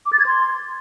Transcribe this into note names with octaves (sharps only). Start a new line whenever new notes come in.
D6
A6
G#6
C6